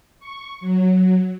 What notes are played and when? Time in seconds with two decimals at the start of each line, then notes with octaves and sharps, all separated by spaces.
0.20 C#6
0.61 F#3